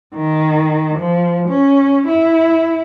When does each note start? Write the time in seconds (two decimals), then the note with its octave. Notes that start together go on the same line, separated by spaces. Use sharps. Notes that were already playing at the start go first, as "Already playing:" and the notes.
0.16 D#3
0.98 F3
1.49 C#4
2.08 E4